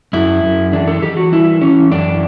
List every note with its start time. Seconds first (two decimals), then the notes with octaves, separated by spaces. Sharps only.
0.13 F#2 E4
0.43 F#2
0.72 E3 D4
0.88 A4
1.02 E3 G4
1.17 F#4
1.32 G3 E4
1.61 E3 C#4
1.91 F#2 D4